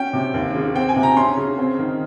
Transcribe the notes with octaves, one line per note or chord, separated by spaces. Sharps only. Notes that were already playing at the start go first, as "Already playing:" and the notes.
Already playing: C#4 G5
C3
D#2
C#3
C4 G5
G#5
C3
A#5
C#4 C6
C#3
C4
D#3